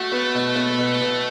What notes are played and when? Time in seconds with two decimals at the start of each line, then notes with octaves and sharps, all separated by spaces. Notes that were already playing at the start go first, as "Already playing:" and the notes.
Already playing: A3 F#4
0.12 B3
0.35 B2
0.56 B3
0.78 B2
1.01 B2